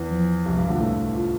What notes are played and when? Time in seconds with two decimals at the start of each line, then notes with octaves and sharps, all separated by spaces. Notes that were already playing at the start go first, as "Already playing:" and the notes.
Already playing: E2 E3
0.10 F3
0.46 C2 C3
0.57 G2
0.68 D2 D3 F4
0.81 A2 A3 E4
0.99 E4
1.16 F4